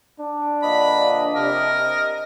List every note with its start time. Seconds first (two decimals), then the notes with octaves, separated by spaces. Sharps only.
0.20 D4
0.63 A#2 D3 F3 D#5 B5
1.35 C3 A#4